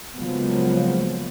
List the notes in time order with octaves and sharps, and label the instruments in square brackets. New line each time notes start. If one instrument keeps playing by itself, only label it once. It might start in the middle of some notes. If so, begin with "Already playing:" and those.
[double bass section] C#3 F3 F#3 G#3 A#3 B3